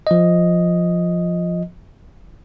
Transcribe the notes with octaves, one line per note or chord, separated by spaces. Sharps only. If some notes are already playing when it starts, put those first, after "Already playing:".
F3 D#5